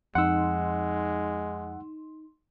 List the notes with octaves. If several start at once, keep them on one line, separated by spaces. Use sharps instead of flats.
F2 G#3 D#4 F#5 C6 E6